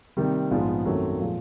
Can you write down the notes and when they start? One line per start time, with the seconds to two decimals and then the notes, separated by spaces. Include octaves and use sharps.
0.17 C3 D#3 G3 A#3
0.51 A#1 G#2 F3 G#3 B3
0.86 F#2 D#3 F#3 A3 C4
1.21 A#2 F3 G#3